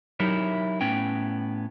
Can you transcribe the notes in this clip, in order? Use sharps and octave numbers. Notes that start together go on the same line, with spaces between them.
F#3 D#4 E4 G4 A#4 E5
A2 B3 C#4 G5